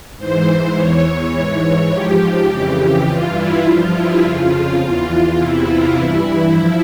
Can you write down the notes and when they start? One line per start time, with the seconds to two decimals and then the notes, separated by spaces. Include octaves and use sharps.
0.18 G#2 E3 C5
0.75 E2 E3 C#5
1.33 G#2 E3
1.91 G#2 F3 G4
2.19 G4
2.49 F2 C#3 E3
3.06 G2 E3 F4
3.35 E4
3.64 G2 F3 F4
3.93 E4
4.22 F2 C#3 F3 F4
4.79 E2 E3
5.37 E2 C3 E3 E4
5.66 F4
5.95 G2 E3 E4
6.52 F3